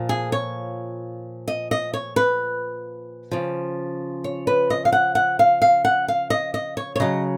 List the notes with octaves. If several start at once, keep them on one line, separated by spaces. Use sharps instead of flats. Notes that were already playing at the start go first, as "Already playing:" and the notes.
Already playing: A#2 F3
G#4
C#5
D#5
D#5
C#5
B4
C#3 F3
C#5
B4
D#5
F5
F#5
F#5
F5
F5
F#5
F5
D#5
D#5
C#5
C#5
C#3 F#3 D#5